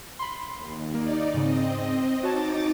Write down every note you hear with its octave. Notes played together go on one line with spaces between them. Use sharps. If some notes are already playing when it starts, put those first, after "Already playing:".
B5 C6
D#2
A#3 D#4 D5
G#2 C#3 C4 D#5
D#4 F#4 C#5 A5 D6 A6